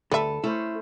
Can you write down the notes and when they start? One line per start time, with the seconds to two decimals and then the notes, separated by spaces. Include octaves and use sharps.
0.11 D2 G3 A4 B4 E5
0.44 A3 C#4 E4 C5